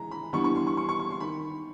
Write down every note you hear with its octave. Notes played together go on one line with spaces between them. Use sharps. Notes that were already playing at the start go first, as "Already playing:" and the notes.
Already playing: E3 G#3 A#5
B5
E3 G3 B3 D4 C#6
C#6
C6
C#6
C#6
C6
C#6
C#6
C6
D#3 B5